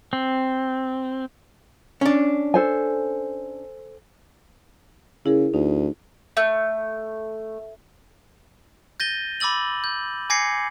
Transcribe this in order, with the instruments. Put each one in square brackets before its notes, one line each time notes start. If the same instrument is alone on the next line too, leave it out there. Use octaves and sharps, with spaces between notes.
[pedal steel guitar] C4
[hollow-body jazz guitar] C#4 D4
[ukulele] A4 C5 G#5
[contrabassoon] C#3 [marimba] E4 G#4 A#4
[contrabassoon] D2 [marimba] D#4
[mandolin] A3
[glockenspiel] G6 A6 A#6 D#7 G7
B5 D6 E6 A6 F#7
G6
G#5 D6 G#6 A#6 C7 C#7